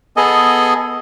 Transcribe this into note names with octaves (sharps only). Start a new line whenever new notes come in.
B3 G#4 A4 D#5 G#5